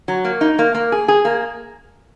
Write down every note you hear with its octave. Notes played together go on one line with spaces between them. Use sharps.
F#3
A#3
D#4
A#3
A#3
G#4
G#4
A#3